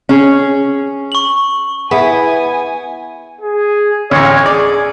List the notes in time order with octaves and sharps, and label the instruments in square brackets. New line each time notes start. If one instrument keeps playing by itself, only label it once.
[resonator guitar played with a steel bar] C#4 G#4
[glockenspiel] C#6 F#7
[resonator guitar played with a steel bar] B3 [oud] E4 G#4 [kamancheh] G#5
[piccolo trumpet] G#4
[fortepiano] A1 D2 [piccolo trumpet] C#5
[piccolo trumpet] G#4 [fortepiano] D5